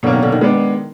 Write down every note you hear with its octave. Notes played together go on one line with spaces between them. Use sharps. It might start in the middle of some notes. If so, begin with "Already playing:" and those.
B2 D3 F#3 A#3 C#4
D#3
D3
D#3
G#3 B3 D4